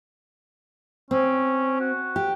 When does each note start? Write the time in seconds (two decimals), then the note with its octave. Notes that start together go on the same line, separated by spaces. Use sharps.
1.11 C4 C#4
1.80 F#4
2.16 G4